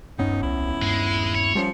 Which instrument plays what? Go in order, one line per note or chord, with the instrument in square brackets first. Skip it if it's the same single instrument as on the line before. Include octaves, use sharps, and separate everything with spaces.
[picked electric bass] D#1 B3 C#4 [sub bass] G2 [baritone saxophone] D#4
[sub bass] C2 [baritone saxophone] E4
[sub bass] G2 [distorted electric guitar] G#3
[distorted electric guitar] C#5
[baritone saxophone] F3 [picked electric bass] G3 A3 C#4